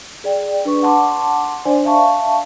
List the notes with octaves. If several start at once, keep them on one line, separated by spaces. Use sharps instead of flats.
G#4 D5 G5
D4 B4 C#6
F#5 A5 C6 D6
D4 C5 D5 G#5 C6
E5 F5 A5 C#6